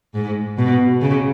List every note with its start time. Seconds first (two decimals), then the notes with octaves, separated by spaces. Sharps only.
0.14 G#2
0.58 B2
1.01 C#3